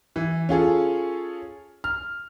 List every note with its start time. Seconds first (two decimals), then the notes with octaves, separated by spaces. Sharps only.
0.16 E3
0.49 C#4 F4 G#4 A4
1.84 F6